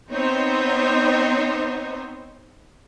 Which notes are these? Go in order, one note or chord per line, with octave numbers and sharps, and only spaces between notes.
B3 C4 D#4 C5 C#5